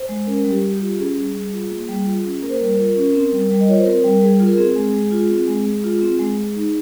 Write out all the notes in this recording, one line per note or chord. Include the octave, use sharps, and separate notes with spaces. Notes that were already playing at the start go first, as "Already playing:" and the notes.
Already playing: C5
G#3
C#4 A#4
G3
G4
G3
G4
F4
C#4 G#4
G3
G3
F4
A#3
G3
F4
C#4
A#3 A#4
C5
G3 A#4
F4
C#4
C4
G3
G3
D#5
F4 C#5
C5
C4 A#4
G3
G3 G#4
F4
A#4
C4 G#4
G#3
G#3
F4
C4
G#3
G#3
F4
C4
G#3
G#3
D#4